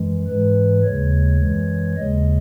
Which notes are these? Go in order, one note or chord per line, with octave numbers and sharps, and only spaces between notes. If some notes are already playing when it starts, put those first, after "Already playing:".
Already playing: F#2 E3 G#3
G#2 E3 G#3 B4
D#2 C#3 G#3 C#5
F#2 E3 G#3
D#2 C#3 G#3 D#5